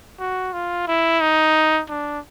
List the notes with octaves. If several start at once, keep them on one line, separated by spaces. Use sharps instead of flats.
F#4
F4
E4
D#4
D4